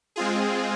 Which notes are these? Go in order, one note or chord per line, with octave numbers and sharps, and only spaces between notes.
G#3 C4 F4 G#4